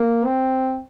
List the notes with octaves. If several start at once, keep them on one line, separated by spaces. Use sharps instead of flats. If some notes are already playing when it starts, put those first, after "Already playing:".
Already playing: A#3
C4